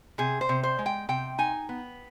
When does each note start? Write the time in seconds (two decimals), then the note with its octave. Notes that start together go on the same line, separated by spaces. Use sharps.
0.18 C3 G#4
0.41 C5
0.49 C3
0.63 C5
0.79 G#3
0.86 G5
1.09 C3 G5
1.38 D#4 G#5
1.69 B3